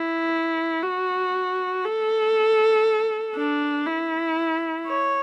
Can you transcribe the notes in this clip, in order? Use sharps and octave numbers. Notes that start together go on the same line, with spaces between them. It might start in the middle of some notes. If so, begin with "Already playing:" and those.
Already playing: E4
F#4
A4
D4
E4
C#5